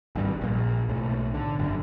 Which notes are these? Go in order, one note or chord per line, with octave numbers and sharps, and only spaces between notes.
G#1 G2 G3
A#1 A#2
B1 A2
D3
G1 F#2 D3